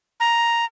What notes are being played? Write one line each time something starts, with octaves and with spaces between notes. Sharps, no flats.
A#5